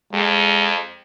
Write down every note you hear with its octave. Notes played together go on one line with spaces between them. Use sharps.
F2 G#3